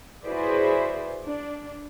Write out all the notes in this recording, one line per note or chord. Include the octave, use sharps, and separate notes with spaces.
E4 F#4 G#4 B4 C5 D5
D4